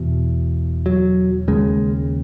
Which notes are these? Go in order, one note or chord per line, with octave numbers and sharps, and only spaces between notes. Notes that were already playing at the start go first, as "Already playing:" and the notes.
Already playing: E2 B2
F#3
D#2 C#3 G#3